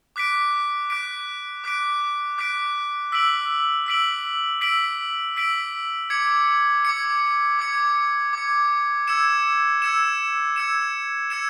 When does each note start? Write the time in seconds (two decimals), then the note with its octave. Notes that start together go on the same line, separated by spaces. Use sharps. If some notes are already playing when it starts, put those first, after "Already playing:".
0.16 D6 F#6 B6 D7
0.90 D6 F#6 B6 D7
1.64 D6 F#6 B6 D7
2.38 D6 F#6 B6 D7
3.12 E6 B6 D7 F#7
3.86 E6 B6 D7 F#7
4.61 E6 B6 D7 F#7
5.36 E6 B6 D7 F#7
6.10 D6 G#6 C#7
6.85 D6 G#6 C#7
7.59 D6 G#6 C#7
8.33 D6 G#6 C#7
9.07 E6 G#6 C#7 E7
9.82 E6 G#6 C#7 E7
10.56 E6 G#6 C#7 E7
11.30 E6 G#6 C#7 E7